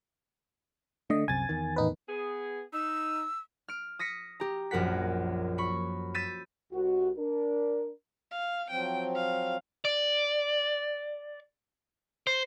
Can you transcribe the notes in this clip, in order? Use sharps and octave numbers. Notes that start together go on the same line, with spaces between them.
D3 A3 D#5
C2 F#2 C3 G#5 A6
E2 D#3
A1 D#4 B4
B3 G#4
D#4 E6
F6 D7
D#6 A#6 B6 C#7
G4 A#5
A#1 F#2 A#4 F#5 B6
B5 C#6
E6 G6 A6 B6 D#7
C2 F#4
D4 A#4
F5
F3 F#3 C4 G5
F5
D5
C5